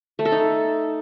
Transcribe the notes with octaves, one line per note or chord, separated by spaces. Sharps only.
A3
A4
D#4